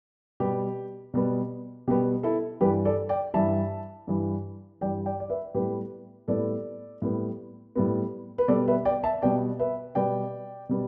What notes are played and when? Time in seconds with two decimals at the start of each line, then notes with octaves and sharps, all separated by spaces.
0.40 B2 G3 B3 G4
1.14 B2 G3 B3
1.87 B2 G3 B3 G4
2.23 E4 A4
2.61 G2 E3 G3 G4 B4
2.85 A4 D5
3.09 D5 G5
3.34 G2 E3 G3 E5 A5
4.07 G2 E3 G3
4.81 G2 E3 G3 D5 G5
5.06 D5 G5
5.20 D5
5.30 B4 E5
5.54 A2 G3 B3 G4 B4
6.28 A2 G3 B3 A4 D5
7.02 A2 G3 B3
7.75 A2 G3 B3
8.38 B4
8.48 B2 G3 B3 A4 D5
8.68 B4 E5
8.85 D5 G5
9.04 E5 A5
9.22 B2 G3 B3 D5 G5
9.60 B4 E5
9.95 B2 G3 B3 D5 G5
10.69 B2 G3 B3